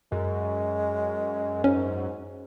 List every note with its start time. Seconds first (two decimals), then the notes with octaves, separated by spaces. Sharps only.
0.12 F#2 G#3
1.64 G#2 C#4